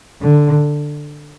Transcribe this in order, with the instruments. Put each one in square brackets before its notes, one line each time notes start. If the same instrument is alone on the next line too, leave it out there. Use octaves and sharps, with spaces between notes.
[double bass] D3